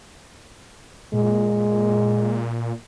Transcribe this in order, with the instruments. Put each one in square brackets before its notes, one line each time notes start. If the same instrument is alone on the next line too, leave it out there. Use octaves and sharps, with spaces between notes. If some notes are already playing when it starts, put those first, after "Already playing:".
[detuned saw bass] A#2 [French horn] G#3